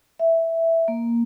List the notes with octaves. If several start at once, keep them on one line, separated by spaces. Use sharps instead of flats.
E5
A#3